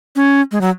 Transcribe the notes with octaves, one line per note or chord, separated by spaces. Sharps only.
C#4
G#3
F#3